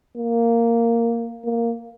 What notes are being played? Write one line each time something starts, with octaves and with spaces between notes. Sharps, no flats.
A#3
A#3